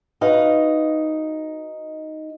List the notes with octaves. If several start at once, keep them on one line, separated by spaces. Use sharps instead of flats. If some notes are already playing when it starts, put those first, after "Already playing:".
D#4 F#4 B4 F5